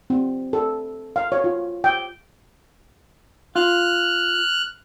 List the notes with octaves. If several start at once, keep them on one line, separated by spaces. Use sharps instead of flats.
C4
A4
F5
C#5
F4
G5
F4 F6 F#6